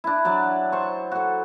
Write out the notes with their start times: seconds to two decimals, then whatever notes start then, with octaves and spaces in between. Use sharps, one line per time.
0.04 D4 E4
0.25 F#3 D5 A5
0.72 C5 C#6
1.12 F#4 A4